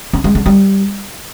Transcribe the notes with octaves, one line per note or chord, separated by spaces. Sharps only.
D4
G#3
D3
G3